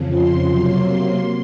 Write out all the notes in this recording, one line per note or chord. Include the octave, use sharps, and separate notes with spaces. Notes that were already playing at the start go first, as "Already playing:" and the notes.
Already playing: F2 C#3 F3
C6
C3 F#3 A#3